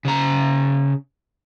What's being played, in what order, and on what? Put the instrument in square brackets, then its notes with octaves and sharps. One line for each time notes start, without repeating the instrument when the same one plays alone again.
[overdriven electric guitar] C#3 A#5